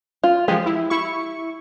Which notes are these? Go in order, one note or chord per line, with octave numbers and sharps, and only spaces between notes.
F4
F3 G#3 G4
E4
E4 C#6